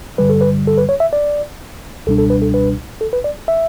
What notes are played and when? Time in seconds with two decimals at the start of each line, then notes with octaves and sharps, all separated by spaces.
0.18 G2 D3 G3 B4
0.30 A4
0.41 B4
0.67 A4
0.78 B4
0.89 C#5
1.00 E5
1.13 D5
2.07 C#2 B2 G3 D4 A4
2.18 A4
2.30 B4
2.42 A4
2.54 B4
3.01 A4
3.13 B4
3.24 D5
3.48 E5